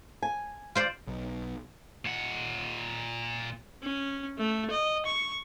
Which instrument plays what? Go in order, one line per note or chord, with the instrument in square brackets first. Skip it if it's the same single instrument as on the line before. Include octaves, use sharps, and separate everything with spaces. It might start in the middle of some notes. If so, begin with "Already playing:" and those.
[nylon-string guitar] G#5
[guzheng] F4 C5 D5
[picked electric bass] B1
[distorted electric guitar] A#2 F#5
[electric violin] C#4
A3
D#5
C#6